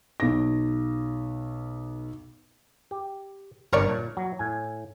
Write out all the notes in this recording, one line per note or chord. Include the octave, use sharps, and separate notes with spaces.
B1 A#6
G4
G1 C3 D4 A#4 C#5 D5
A#2
F#3
A2 G#5